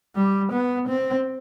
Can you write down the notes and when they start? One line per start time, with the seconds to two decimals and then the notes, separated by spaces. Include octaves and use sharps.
0.16 G3
0.53 B3
0.89 C4